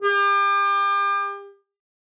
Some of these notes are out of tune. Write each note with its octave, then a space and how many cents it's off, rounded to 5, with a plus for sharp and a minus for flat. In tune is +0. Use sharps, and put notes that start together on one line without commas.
G4 +35